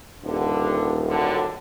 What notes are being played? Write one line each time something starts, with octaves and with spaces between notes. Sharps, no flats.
D#1 G2 D3
F#2 A2 D3